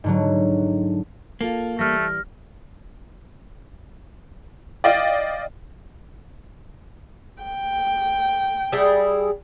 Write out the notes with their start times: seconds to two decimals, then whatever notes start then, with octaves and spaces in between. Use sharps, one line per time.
0.04 G#2 D3 F#3
1.41 A#3 F4 A4
1.79 E3 G3 A3 F6 A#6
4.84 D5 D#5 F5 G5
7.43 G5
8.72 G3 E4 G#4